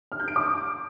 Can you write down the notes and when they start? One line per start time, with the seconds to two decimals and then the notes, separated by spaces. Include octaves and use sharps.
0.12 F6
0.20 G6
0.28 D7
0.36 D6